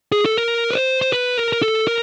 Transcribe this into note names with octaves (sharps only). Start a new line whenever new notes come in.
G#4
A4
A#4
B4
C5
C5
B4
A#4
A#4
A4
A#4